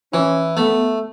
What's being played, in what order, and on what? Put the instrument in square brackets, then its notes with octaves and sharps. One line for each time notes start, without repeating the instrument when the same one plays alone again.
[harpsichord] E3 [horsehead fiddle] C#4
[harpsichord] A3 [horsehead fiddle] B3